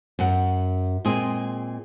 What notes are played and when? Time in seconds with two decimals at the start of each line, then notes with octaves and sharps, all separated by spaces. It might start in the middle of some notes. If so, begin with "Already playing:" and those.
0.19 F#2 F#5
1.05 A#2 G#3 C4 G#4